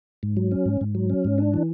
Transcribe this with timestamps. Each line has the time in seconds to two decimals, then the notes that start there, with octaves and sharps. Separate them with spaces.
0.23 G#2
0.37 F#3
0.52 C#4
0.66 G#2
0.81 G#2
0.95 F#3
1.10 C#4
1.25 G#2
1.38 D4
1.54 E3